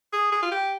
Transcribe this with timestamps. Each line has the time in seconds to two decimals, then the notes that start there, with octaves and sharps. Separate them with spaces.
0.13 G#4
0.32 G#4
0.43 F4
0.52 G4